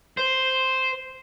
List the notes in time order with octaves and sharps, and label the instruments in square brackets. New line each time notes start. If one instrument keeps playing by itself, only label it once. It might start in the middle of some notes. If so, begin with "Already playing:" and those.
[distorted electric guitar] C5